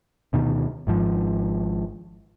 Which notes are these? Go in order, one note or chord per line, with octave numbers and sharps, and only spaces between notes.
D2 B2 D#3
G#1 G#2 F3